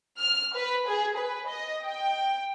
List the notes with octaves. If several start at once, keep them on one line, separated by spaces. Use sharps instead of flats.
F6
B4
G#4
B4
D#5
G5